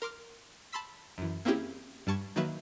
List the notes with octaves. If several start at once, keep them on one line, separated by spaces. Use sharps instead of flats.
A#4 C6 D6 F6
A5 B5 C6 E6 B6
F#2 E3
A#3 C4 C#4 E4 G4 G#4
G2 G3 A5 C#6 G#6
D#3 F#3 A#3 B4 E5